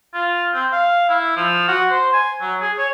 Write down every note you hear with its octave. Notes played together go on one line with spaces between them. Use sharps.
F4
C4
F5
E4
F3
F#4
C5
G#5
F#3
G#4
C#5